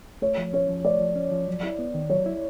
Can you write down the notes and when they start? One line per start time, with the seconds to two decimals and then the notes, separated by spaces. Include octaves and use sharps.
0.22 A3 C#5
0.38 F3
0.53 C#4 C#5
0.69 F3
0.85 A3 D5
1.01 F3
1.16 C#4
1.32 F3
1.47 F#3
1.63 E4
1.79 B3
1.94 D#3
2.10 F#3 C#5
2.26 E4